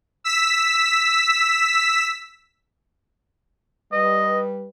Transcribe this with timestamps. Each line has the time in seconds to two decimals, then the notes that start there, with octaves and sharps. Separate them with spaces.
0.24 E6 B6
3.92 G3 B4 D#5